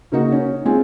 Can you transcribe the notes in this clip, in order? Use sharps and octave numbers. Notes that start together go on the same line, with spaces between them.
C#3 A#3 D#4 F#4
C#4
G#3 C4 F4 G#5